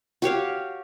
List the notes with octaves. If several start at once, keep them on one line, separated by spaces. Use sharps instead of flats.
F#4 G4 C#5 F5